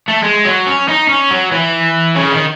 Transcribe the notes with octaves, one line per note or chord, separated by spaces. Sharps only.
A3
G#3
F#3
C#4
D#4
C#4
F#3
E3
C#3
D#3